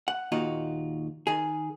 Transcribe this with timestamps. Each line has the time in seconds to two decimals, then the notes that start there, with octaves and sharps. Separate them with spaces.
0.08 F#5
0.32 D#2 A#2 D#4 F4 F#4
1.27 D#3 G#4